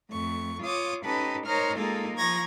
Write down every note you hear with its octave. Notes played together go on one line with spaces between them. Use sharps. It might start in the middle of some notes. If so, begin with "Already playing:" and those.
F2 A3 C#6
F4 C#5 D6 D#6
C#4 D#4 G4 A4 B4
D#4 A#4 C5 C#5 A#5 F6
G#3 A#3 D#4 F4 G#4 A4
F3 A#5 C#6 G#6 A#6